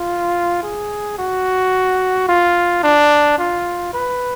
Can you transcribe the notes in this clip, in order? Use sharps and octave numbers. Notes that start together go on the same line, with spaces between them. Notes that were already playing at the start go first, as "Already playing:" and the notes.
Already playing: F4
G#4
F#4
F4
D4
F4
B4